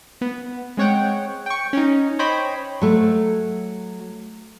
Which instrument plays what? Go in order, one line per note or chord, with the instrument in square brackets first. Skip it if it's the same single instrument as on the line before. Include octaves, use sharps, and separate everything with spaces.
[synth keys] B3
G#3 C4 C#5 F#5 G5
G5 C#6
C#4 D#4
C5 C#5 D#5 G5 B5
[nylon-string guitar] F#3 A3